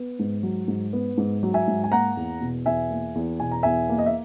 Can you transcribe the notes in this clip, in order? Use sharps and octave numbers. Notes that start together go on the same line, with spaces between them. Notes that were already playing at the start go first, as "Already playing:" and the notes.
Already playing: B3
G#2
F#3
G#2
B3
G#2
F#3
E5 G#5
G#2
G#5
A#3 F#5 A#5
E2
B2
E2 E5 G#5
A#3
E2
B2 G#5
A#5
E2 E5 G#5
A#3
D#5
E5